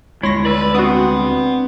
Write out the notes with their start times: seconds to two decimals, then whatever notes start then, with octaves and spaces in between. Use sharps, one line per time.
0.23 D2 G3 G#3 E4 C#5 C6 A#6
0.45 B4 D5 E6
0.75 B3 C4 D4 F#4 D#6